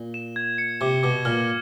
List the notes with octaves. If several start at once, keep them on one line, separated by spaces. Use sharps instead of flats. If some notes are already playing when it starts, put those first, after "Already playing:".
Already playing: A#2
E7
G#6
C#7
C3 D6
B2 D6
A#2 F6